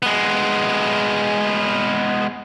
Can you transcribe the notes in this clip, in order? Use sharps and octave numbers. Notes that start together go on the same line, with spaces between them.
G#3 B3